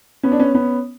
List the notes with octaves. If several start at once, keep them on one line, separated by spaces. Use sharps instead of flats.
B3 C#4
D4
B3 C#4
B3 C#4